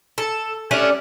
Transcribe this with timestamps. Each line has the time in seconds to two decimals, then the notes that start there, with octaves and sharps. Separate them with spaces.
0.18 A4
0.71 G3 A3 C#4 D4